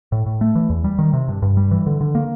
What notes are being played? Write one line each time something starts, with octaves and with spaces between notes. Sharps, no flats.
A2
A2
A3
E3
E2
G3
D#3
C3
G2
G2
G3
E3
D3
D3
A#3